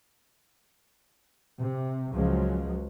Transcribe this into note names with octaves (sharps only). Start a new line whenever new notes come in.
C3
C#2 C#3 F3 F#3 G#3